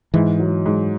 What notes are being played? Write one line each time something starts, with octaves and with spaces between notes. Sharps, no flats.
G#2 E3
F#3
G#2